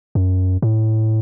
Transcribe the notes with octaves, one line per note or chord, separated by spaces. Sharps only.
F#2
A2